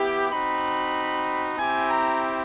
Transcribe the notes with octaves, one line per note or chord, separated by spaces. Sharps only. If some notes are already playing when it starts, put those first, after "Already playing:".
Already playing: B3 E4 G4
C4 D#4 F#4 B5
C4 E4 G4 G#5
A#5